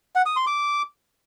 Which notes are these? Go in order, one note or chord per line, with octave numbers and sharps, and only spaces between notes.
F#5
D#6
C6
D6